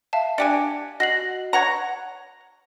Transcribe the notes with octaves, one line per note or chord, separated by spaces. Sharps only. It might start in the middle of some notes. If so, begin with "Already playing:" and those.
E5 F5 A5
D4 G4 G#5 C#7
F#4 D#5 C7 F#7
C#5 F#5 A#5